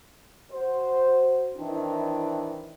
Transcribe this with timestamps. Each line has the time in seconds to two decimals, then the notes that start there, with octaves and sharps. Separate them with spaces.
0.52 F#4 C5
1.57 D#3 E3 C4 D4 E4